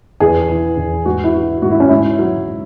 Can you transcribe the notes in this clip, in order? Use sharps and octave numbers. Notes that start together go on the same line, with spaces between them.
E2 G#4
E3
E2
G#2 F#4
E4
E3 F#4
G#2 F#4
E4
C#4
G#2 E4
F#3